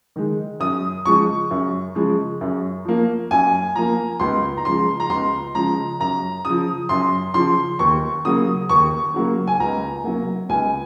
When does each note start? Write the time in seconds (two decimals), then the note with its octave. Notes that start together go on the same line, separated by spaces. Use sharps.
0.16 D#3 G#3
0.60 F#2 D#6
1.05 C#3 F3 G#3 C#6
1.51 F#2
1.95 C#3 F3 G#3
2.41 F#2
2.85 F3 A#3
3.31 F#2 G#5
3.75 F3 A#3 A#5
4.20 C#2 C6
4.57 A#5
4.65 C#3 F3 G#3 C6
5.00 A#5
5.09 C#2 C6
5.55 C#3 F3 G#3 A#5
6.00 F#2 A#5
6.45 C#3 F3 D#6
6.89 F#2 C6
7.34 C#3 F3 C6
7.79 D#2 C#6
8.25 C#3 F#3 A#3 D#6
8.69 D#2 C#6
9.14 C#3 F#3 A#3
9.47 G#5
9.60 C#2 A#5
10.04 C3 F#3 A#3
10.49 C#2 G#5